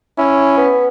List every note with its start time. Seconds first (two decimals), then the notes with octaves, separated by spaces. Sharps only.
0.18 C#4 E4
0.57 B3